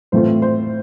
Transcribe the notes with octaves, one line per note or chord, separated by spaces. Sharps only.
A2 E3 A3 C4 F4 C5
C5